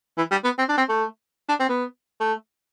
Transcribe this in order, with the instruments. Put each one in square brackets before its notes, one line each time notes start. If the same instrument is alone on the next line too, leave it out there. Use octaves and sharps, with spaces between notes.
[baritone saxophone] E3
G3
B3
C4
D4
C4
A3
D4
C4
B3
A3